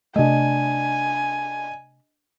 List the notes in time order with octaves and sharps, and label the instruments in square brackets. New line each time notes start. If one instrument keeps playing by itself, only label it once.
[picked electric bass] C3 A3 [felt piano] D4 D#5 [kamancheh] G#5